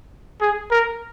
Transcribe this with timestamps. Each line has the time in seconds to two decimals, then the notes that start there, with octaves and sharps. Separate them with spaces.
0.41 G#4
0.71 A#4